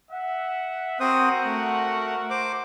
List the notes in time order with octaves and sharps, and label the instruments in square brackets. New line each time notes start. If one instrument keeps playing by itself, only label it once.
[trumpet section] E5 F#5
[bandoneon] C4 C5 D#6 [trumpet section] F#4 A#4 F#5
[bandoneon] A3
C5 D6